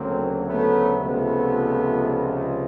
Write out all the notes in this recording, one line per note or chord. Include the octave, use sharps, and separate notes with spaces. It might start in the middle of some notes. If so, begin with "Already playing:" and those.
Already playing: D2 C#3 F#3 A#3 C4
A3 B3
C#2 C3 F3 A3 B3